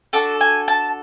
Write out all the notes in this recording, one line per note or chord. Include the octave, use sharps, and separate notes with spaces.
D4 F#4 A4 A5
G#5
A5